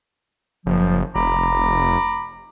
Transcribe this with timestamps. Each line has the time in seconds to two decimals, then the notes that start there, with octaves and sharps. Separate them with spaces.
0.66 F#1 F3
1.15 F1 A#5 B5 D6